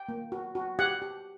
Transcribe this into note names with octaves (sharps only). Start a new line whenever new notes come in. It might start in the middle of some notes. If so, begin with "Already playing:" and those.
Already playing: G5
A#3
F#4
F#4
G4 F#5
G4